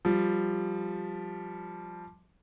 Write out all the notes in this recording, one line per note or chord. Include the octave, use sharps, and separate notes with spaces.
F3 G3